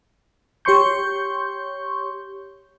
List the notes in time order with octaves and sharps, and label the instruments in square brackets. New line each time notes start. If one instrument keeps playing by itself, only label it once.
[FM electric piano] G4 C#5 C6 C#6 G6